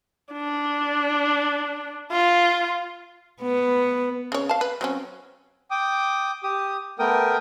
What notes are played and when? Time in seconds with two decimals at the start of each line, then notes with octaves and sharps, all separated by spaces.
0.33 D4
2.12 F4
3.42 B3
4.32 C#3 C#5
4.49 F5 A5
4.61 B4
4.81 F#3 C4 C#4
5.71 G5 D6 D#6
6.43 G4 D#6
6.99 A3 B3 A#4 G5 D#6